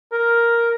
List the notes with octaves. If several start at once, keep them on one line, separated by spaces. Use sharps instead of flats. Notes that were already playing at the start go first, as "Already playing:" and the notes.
A#4